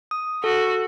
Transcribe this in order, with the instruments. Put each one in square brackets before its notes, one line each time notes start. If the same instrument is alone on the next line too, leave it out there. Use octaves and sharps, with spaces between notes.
[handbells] D#6
[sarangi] F#4 [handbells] A4